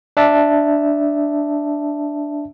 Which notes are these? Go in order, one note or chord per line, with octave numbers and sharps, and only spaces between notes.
D4 E5 A5